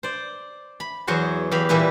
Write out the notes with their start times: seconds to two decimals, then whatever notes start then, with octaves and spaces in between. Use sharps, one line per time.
0.03 C5 D5
0.80 B5
1.07 E2 F#3 F#4 G#4 C5
1.51 E2 G4 F5 B5
1.69 A#2 E3 G3 E4 B4